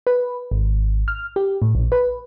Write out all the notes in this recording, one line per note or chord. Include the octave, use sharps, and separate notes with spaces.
B4
G#1
F6
G4
A2
A#1
B4